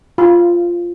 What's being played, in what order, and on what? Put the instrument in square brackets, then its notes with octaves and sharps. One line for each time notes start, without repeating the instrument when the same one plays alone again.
[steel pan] F4